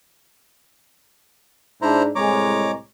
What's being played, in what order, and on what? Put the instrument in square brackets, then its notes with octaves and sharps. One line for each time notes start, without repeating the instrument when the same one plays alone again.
[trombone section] G#2 D4 [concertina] E4 C5 A#5
[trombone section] C2 A2 G#3 [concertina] C#5 A#5 D6